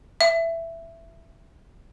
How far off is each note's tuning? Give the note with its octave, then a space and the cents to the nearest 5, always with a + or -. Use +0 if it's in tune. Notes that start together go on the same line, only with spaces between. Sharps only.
E5 +10